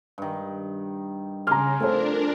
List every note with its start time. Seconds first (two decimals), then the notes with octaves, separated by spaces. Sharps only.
0.18 G2 D#3
1.47 C#3 G#5 A#5 C6 D6 F6
1.80 F3 A3 C4 D4 A#4 C5